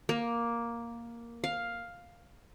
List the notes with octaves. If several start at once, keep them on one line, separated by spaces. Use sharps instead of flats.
A#3
F5